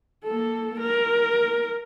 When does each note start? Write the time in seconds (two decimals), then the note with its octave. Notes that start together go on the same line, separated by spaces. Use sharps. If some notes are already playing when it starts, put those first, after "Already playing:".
0.24 A#3 A4
0.80 A#4